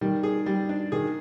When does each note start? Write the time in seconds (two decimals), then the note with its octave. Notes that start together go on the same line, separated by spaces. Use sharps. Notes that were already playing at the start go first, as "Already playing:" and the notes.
0.01 D#3 G3
0.23 G#4
0.46 G3
0.69 D4
0.92 D#3 G#4